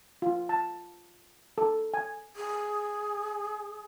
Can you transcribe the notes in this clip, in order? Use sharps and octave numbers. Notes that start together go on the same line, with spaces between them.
F4
A5
A4
G#5
G#4